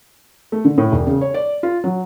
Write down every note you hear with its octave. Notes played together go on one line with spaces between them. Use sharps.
A3
D3
A2
E1
C#3
C#5
D5
F4
F#3